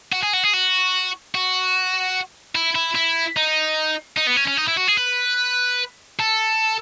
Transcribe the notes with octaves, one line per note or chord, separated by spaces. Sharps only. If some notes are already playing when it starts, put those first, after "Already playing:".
F#4
G#4
F#4
G#4
F#4
F#4
E4
E4
E4
D#4
D#4
B3
C#4
C#4
D#4
E4
F#4
G#4
B4
A4